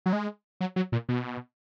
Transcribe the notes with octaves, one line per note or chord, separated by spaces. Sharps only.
F#3
G#3
F#3
F#3
A#2
B2